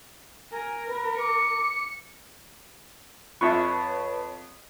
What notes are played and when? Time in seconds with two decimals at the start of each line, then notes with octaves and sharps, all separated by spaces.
0.52 A#4 G#5
0.87 B4
1.18 D6 C#7
3.41 F2 F4 B4 C#5 E5 A5 C#6